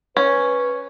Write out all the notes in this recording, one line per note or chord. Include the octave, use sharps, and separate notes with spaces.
C#4 B4